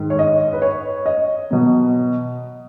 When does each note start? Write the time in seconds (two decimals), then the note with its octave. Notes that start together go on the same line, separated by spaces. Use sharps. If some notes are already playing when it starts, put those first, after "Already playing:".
Already playing: G#2 D#3 G#3
0.10 C#5
0.19 D#5
0.53 B4
0.62 C#5
1.06 D#5
1.51 B2 F#3 B3